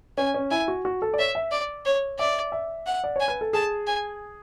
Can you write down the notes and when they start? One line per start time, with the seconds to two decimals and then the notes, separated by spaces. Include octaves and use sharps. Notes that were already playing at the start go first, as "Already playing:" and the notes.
0.18 C#4 G#5
0.34 C#4
0.51 E4 G#5
0.68 F#4
0.85 F#4
1.02 A4
1.14 D5
1.19 C#5 E5
1.35 E5
1.51 D5
1.86 C#5
2.19 D5 E5
2.52 E5
2.86 F#5
3.04 D5
3.16 C#5 G#5
3.28 B4
3.41 A4
3.53 G#4 A5
3.87 G#5